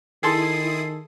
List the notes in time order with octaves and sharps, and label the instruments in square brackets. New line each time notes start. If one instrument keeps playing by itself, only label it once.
[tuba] D#3 [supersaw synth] E4 D#6 [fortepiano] G#4 A4 C6 [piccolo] C7